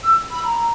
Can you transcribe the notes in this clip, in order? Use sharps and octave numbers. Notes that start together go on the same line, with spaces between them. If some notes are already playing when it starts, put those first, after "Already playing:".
E6
B5
A#5